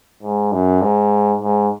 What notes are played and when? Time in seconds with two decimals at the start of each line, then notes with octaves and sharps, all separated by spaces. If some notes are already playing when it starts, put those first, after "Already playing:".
0.23 G#2
0.52 F#2
0.82 G#2
1.41 G#2